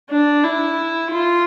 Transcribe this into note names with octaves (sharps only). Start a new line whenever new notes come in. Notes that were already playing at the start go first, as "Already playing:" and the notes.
D4
E4
F4